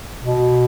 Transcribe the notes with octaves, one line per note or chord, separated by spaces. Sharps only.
B2